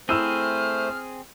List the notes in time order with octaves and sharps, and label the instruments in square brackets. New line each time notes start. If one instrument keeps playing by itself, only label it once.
[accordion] A3 C5 [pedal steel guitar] C4 G#4 [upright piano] E4 E6 E7 [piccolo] F6